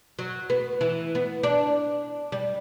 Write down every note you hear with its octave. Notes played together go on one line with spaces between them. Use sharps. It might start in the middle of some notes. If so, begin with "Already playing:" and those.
F#3
B3
E3
B3
D4
G3